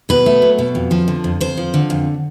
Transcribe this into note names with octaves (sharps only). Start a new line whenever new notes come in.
B2 B4
A3
F#3
B2
F2
F3
D3
F2
F2 C5
F3
D3
F2